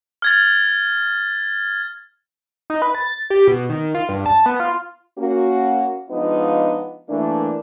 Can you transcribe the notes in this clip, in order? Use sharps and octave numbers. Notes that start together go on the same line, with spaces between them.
F6 G#6 A6
D#4
B4
A6
G4
B2
D#3
F4
G2
A5
B3
F4
A#3 C#4 F#4
F3 G#3 B3 D4 D#4 F4
E3 A3 A#3 D4